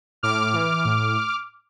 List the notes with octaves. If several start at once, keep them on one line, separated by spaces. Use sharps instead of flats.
A2 D6 F6
E3
A2